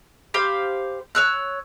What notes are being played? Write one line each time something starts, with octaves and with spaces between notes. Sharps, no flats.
G4 C5 F5 B5
C#5 E6 F#6